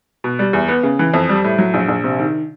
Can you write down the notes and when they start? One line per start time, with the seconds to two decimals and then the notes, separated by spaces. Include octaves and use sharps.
0.24 B2
0.39 G3
0.53 E2
0.68 B3
0.83 C#3
0.99 E3
1.14 F2
1.29 G3
1.44 A2
1.58 F#3
1.74 A#1
1.88 A#1
2.04 C3
2.19 D#3